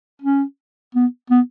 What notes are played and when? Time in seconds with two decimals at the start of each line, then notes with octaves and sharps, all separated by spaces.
0.22 C#4
0.95 B3
1.30 B3